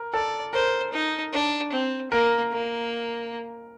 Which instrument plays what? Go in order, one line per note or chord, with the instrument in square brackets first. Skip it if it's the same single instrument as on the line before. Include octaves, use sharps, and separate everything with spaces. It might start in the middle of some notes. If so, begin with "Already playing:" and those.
Already playing: [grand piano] A#4
[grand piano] A4 [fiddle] D5
[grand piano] A#4 [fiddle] C5
[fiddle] D#4
D4
C4
[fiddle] A#3 [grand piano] A#4
[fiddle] A#3